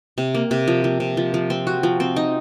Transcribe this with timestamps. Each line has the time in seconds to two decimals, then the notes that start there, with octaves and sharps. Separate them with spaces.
0.18 C3
0.35 A#3
0.51 C3
0.68 F3
0.84 F3
1.00 C3
1.17 F3
1.34 F3
1.50 C4
1.67 F#4
1.83 F3
2.00 C4
2.16 D#4